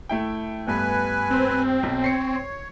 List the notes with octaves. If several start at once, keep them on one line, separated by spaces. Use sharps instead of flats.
A3 E4 G5
G2 A3 B3 B4 G#5
C4
B1
C#5 C7 C#7